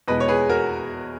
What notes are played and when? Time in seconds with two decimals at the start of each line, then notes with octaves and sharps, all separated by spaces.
0.08 E2 B2 G#3 B4 D#5
0.20 C#5
0.28 G#4 B4
0.49 F#4 A#4